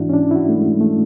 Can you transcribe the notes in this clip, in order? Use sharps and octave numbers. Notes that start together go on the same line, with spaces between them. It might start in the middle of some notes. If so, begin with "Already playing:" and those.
Already playing: G#2 E3 D4 E4 F#4
C#4
D4
E4
F#4
A3
G#3
A3